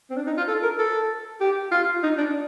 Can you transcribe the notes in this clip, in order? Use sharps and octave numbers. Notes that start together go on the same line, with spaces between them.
C4
D4
D#4
F4
A4
A#4
A4
G4
F4
D#4
D4